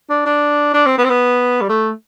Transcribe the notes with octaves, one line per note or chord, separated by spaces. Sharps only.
D4
D4
D4
C4
B3
C4
B3
G3
A3